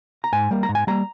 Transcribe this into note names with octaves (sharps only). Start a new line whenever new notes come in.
A#5
G#2 G#5
G3 A#3
A#5
G#2
G#5
G3 A#3 A#5